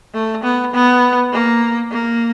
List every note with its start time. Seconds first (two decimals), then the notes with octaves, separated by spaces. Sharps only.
0.14 A3
0.43 B3
0.73 B3
1.33 A#3
1.92 A#3